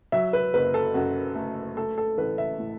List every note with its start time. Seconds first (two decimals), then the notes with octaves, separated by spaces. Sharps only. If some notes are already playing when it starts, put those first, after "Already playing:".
0.12 F#3 E5
0.33 B4
0.54 F#1 B4
0.74 A4
0.94 F#2 F#4
1.35 A3
1.77 A3 A4
1.98 A4
2.18 A1 B4
2.38 E5
2.59 A2